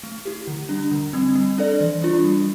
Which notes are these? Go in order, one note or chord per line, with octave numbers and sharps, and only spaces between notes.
A3
E4 G4
D3
G3 D4
D3
G3 C4
G3
D4 A4 D5
E3
G3 D4 F4
G3